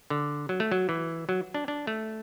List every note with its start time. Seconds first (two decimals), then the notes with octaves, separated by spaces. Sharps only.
0.10 D3
0.49 F#3
0.60 A3
0.72 F#3
0.89 E3
1.29 F#3
1.54 D4
1.68 D4
1.87 A3